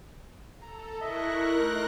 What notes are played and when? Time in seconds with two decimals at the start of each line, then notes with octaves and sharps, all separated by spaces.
0.62 A4 A#5
1.01 E4 A#4 D#5 E5 C#6 F#6 A#6
1.56 A3 D#4 C6